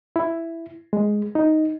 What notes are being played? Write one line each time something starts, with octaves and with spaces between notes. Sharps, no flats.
E4
G#3
D#4